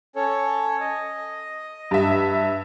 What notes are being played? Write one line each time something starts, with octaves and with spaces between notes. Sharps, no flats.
C#4 A4 C#5
D#5
G2 E5